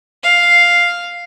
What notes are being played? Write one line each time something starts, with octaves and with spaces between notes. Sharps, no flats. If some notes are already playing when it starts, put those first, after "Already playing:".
F5